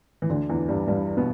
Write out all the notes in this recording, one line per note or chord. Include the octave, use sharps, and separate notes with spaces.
E3
D2 D3
E2 E3
G2 G3
G2 G3
B2 B3